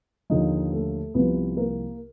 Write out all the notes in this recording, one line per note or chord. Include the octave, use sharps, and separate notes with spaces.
D#2 D3 F3 D#4 D#5
A3 A4
C2 C3 F3 B3 B4
A#3 A#4